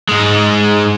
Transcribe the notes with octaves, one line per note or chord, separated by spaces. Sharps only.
G#2 G#3